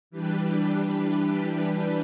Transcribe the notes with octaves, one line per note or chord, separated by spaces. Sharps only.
E3 G3 D4 G4 B4